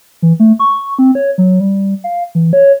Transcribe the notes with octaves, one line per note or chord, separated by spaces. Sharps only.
E3
A3
C#6
C4
C#5
F#3
G3
F5
E3
C#5